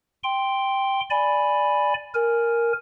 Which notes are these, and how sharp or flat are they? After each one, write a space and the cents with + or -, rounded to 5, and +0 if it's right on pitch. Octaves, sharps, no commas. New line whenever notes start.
G5 +0 C6 +0
D5 +0 G#5 +0 B5 +0
A#4 +0 G#5 +0